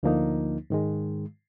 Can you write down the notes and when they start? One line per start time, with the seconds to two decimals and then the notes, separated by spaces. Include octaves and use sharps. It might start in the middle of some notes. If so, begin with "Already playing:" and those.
0.03 D2 D3 F3 A#3 D#4
0.70 G#2 D#3 G#3